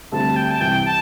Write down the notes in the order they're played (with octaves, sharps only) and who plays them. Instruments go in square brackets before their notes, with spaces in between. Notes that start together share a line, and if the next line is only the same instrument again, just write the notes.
[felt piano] D2 D3 G3 C4 [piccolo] A5
[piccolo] G5
A5
[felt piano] C2 C3 E3 [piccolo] G5
[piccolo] A5